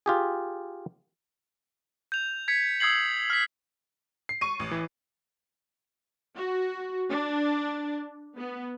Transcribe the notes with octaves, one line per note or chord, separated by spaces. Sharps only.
F4 G4 G#4
G6 F7
G#6 B6 C#7
D#6 E6 G#6 C7 F#7
F6 B6
C7
C#6 D#7
A1
E3
F#4
D4
B3